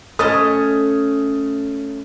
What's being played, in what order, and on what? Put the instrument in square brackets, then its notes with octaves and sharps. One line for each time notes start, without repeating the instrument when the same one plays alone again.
[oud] A3 C#4 D#5 [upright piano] D#6